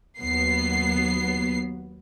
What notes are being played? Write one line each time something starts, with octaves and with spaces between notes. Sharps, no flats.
D#2 F#3 B3 C7